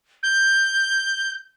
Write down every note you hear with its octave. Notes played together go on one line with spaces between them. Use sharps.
G6